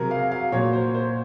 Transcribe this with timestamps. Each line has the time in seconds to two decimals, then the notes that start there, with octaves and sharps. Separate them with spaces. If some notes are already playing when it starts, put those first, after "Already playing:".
Already playing: C3 F#3 G#4 A#4
0.11 F5
0.32 F5
0.52 A#2 F#3 C#5
0.73 C5
0.94 C5